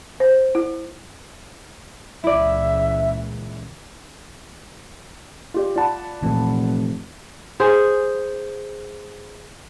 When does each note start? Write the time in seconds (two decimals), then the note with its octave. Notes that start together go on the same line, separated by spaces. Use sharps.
0.20 C5
0.55 E4
2.24 C#2 A#2 E3 E4 D5 E5
5.54 F4 G4 D5
5.76 F4 D5 F#5 A5 B5
6.22 F1 A#2 E3
7.60 G#4 C5